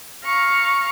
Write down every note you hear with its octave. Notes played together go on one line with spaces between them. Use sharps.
F5 A#5 C#6